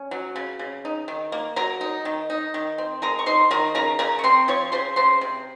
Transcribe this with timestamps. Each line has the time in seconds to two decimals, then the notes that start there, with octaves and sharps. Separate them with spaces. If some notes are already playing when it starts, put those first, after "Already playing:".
Already playing: C#4
0.11 F#3
0.36 C#3
0.59 C#3
0.85 D#4
1.08 D#3
1.32 A#3
1.56 F#3 A#4 A#5
1.81 D#4
2.05 D#3
2.30 D#4
2.54 D#3
2.78 C4
3.02 G#3 A#4 A#5
3.19 C#6
3.26 D#4 C5 C6
3.51 D#3 A#4 A#5
3.75 C#3 A#4 A#5
3.99 C#3 A#4 A#5
4.19 C#6
4.24 C4 C5 C6
4.48 F3 C#5 C#6
4.72 C#3 C5 C6
4.96 C#3 C5 C6
5.21 C3